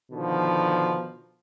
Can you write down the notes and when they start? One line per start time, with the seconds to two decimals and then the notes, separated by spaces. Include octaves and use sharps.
0.10 B2 D3 D#3 F3